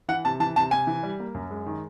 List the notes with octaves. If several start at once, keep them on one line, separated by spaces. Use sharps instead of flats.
E3 F#5
C3 A5
E3 A5
C3 A5
C3 G#5
E3
G3
A#3
F#2
G#3
D#3